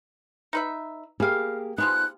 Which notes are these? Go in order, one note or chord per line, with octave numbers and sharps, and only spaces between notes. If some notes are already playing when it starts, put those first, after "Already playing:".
D#4 B4 E5
G3 A#3 G4 G#4 F5
F3 G#3 B3 D#4 F#6